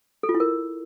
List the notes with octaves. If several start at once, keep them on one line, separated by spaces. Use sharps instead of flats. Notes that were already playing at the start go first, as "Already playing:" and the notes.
A4
F4
E4
A#4